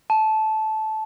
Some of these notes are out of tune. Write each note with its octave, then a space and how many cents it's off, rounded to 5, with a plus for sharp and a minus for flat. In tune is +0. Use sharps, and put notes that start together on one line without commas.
A5 -15